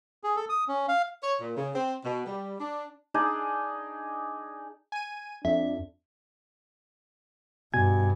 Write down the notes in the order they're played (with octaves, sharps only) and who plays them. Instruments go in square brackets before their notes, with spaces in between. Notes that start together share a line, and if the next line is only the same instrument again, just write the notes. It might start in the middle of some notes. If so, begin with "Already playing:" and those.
[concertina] G#4
A4
D#6
C#4
F5
[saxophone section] C#5
A#2
C#3
C4
B2
G3
D4
[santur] D4 D#4 G#4 D5
[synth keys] G#5 D#7
[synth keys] F2 [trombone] D4 [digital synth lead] E5
[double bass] G2 [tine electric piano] B2 G#5 G#6